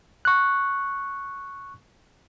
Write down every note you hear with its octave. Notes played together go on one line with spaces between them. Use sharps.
C#6 F#6